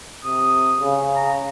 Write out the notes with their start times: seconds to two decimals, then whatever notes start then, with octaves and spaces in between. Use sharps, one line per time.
0.25 C3 D#6
0.80 C#3
1.16 A#5